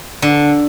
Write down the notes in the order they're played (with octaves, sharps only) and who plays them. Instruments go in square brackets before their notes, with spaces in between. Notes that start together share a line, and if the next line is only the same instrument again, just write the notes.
[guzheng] D3